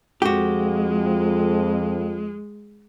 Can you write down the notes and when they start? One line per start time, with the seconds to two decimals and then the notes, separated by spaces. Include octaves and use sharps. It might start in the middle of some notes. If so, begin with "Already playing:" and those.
0.22 F2 G#3 F#4 G4